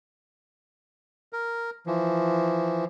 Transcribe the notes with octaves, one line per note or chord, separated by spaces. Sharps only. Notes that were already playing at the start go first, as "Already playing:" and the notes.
A#4
E3 F3